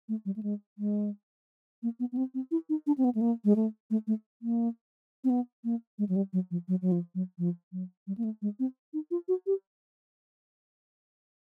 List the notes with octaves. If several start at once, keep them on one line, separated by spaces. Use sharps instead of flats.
A3
G3
A3
G#3
G#3
A#3
B3
B3
C4
C4
E4
D#4
D4
C4
B3
A3
A#3
G#3
A3
A3
A3
A#3
C4
B3
A#3
G#3
F#3
G3
F#3
F3
F#3
F#3
F3
F#3
F3
F#3
G3
A#3
A3
G#3
C4
D#4
F4
F#4
G4